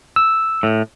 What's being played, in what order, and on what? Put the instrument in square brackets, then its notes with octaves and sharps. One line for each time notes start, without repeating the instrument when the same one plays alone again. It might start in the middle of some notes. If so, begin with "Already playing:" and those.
[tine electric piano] E6
[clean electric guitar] A2